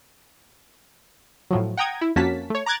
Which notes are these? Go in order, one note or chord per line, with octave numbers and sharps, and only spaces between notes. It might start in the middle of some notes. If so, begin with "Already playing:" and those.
A2 F3 F#3
F#5 G5 A#5 D#6 G#6
E4
F2 A#3 C#4 F#4 A5 B6
A3 C#5
A#5 D6 F#6 G#6 A6